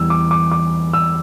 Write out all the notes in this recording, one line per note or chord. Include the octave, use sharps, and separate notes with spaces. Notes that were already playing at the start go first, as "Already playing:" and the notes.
Already playing: E2 E3 G3 E6
D6
D6
D6
E6